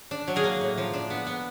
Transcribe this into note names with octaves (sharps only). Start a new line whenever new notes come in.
D4
F#3
G#4 A#4
A#3
A2
F3
D4
B3
B3